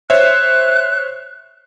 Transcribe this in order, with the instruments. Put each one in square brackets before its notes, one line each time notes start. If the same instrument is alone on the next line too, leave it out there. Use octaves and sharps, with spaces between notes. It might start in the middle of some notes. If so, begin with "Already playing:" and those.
[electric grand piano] C5 C#5 E5 [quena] F#6